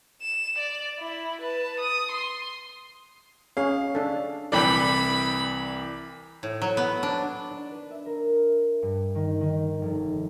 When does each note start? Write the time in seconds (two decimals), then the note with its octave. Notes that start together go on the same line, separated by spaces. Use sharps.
0.22 E7
0.58 D5
0.99 E4
1.41 B4 A5
1.80 D#6
2.11 C6
3.57 C#4 G#4 C#5 F5
3.95 D4 A4
4.52 C2 E3 A4 D5 G5 B5
6.43 A2
6.62 F#3
6.77 B3
7.03 D4
7.51 D4
7.72 B4
7.91 E5
8.06 A#4
8.83 G2
9.15 D#3
9.41 D#3
9.82 F1